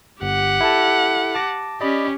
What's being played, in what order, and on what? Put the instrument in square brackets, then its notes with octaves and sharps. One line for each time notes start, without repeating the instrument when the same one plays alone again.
[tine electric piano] G1 [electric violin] G4 F#5
[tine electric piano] E4 A4 A5
A5 D6 A#6
[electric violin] C#4 G4 [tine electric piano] D5 D#5 B5